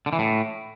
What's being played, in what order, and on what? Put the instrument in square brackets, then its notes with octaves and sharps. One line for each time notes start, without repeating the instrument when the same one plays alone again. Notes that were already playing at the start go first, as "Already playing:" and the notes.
[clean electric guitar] D3
E3
A2